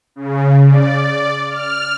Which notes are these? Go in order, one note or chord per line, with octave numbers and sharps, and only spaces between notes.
C#3
D5
F6